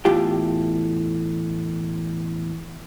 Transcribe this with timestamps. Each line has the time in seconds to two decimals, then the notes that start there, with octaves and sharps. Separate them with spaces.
0.05 E2 A2 F4 G4 G5